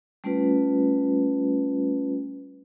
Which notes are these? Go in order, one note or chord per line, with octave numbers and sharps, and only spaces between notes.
G3 A3 C#4 F4 B4